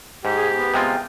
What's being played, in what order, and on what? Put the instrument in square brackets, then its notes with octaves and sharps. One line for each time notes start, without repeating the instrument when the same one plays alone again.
[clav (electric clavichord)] G#2 [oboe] G4
[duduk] G#4
B3
[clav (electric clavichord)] C3 G#3 F4 [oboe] G5